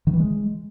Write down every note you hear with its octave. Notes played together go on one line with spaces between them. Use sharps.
D#3
E3
G#3